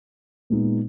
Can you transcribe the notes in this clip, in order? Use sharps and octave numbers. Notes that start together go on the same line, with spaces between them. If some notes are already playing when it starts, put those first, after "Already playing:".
A#2 G#3 B3 D#4